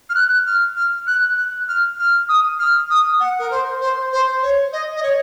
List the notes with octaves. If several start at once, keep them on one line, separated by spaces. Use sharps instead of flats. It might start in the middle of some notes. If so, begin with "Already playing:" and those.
F6
F#6
F6
F6
F#6
F#6
F6
F6
D#6
F6
D#6
F#5
A#4
C5
C5
C5
C#5
D#5
D#5
C#5